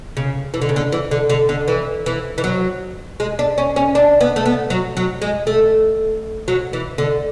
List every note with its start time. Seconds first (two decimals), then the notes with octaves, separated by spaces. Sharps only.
0.17 C#3
0.54 E3
0.62 D3
0.69 C#3
0.76 D3
0.92 E3
1.11 D3
1.30 D3
1.49 D3
1.68 E3
2.06 E3
2.38 E3
2.44 F#3
3.20 G#3
3.39 D4
3.58 C#4
3.76 C#4
3.95 D4
4.21 B3
4.36 A3
4.46 B3
4.70 F#3
4.97 F#3
5.22 G#3
5.47 A3
6.48 F#3
6.73 E3
6.98 D3